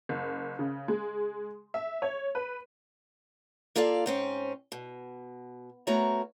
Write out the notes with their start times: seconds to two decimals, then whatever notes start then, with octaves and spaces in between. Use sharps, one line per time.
0.09 F#1
0.59 C#3
0.88 G#3
1.74 E5
2.02 C#5
2.35 B4
3.76 A#3 F4 A4 D5 F5
4.06 G#2 C4 C#4
4.72 B2
5.87 A3 B3 F#4 A#4 C#5 A#5